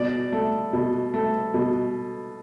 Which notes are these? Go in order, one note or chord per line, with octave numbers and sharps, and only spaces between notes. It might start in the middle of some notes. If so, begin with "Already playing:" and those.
Already playing: B2 D5
A3
B2
A3
B2